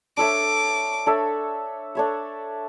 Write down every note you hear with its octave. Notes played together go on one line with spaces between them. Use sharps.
D4 A4 C#5 E5 D6
D4 A4 C#5 E5
D4 A4 C#5 E5